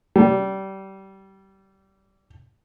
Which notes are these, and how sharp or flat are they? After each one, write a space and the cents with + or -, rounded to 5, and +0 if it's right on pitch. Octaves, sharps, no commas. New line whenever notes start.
G3 -25